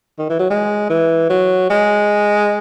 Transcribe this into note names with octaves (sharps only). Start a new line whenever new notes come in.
D#3
E3
F#3
G#3
E3
F#3
G#3